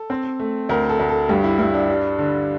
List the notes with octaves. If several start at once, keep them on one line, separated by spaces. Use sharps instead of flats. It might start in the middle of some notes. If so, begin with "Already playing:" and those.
Already playing: A4
C4
A3
D2 A#4
A4
D2
A4
G2 G4
E4
G2 E4
D4
G3
D3